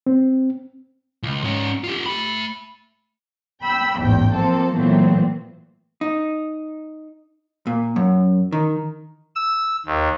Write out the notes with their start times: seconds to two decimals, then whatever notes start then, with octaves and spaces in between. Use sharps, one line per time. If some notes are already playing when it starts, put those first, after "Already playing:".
0.06 C4
1.23 C#2
1.44 G#2 C#4
1.84 F4 G4
2.06 A3 B5
3.62 G5 B5 E6
4.01 A1 E2 G#2 G5
4.33 F3 A#3 C4 A4
4.75 A#2 E3 F#3 A3 B3 C4
6.01 D#4
7.67 A#2
7.96 F#2
8.52 D#3
9.36 E6
9.86 D#2